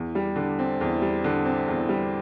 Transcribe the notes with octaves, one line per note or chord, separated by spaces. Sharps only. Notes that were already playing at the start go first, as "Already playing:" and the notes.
Already playing: E2
G3
D3
C4
E2
G3
D3
C4
E2
G3